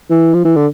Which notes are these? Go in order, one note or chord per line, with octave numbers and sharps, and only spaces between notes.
E3
F3
E3
D3